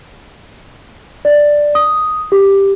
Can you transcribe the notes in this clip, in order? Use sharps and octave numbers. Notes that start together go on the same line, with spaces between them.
D5
D#6
G4